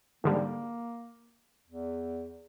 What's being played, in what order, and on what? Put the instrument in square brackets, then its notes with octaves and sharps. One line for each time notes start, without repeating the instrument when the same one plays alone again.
[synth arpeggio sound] G#2 D3 G3 [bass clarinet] A#3
[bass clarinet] E2